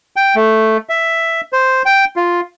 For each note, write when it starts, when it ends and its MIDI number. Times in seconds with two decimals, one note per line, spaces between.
0.16 0.35 79
0.35 0.77 57
0.89 1.41 76
1.53 1.82 72
1.85 2.05 79
2.16 2.41 65